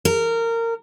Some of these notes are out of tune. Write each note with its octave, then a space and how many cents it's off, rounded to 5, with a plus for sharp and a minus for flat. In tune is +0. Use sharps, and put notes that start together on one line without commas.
A#4 -20